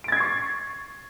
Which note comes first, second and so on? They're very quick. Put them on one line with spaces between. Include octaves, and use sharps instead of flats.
D7 A6 G#6 C7 C#6